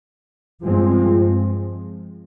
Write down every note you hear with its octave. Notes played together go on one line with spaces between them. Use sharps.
G2 F3 G#3 C4